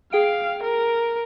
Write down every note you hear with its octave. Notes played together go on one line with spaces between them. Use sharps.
G#4 F5 G5 D7
A#4